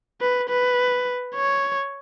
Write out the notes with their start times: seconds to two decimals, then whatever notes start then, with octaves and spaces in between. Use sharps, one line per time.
0.21 B4
0.49 B4
1.35 C#5